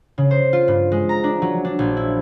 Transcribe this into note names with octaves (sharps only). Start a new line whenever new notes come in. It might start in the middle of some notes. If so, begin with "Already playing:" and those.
C#3
C5
F4
G2
G#3
A#5
D4
F#3
D4
A#1
E4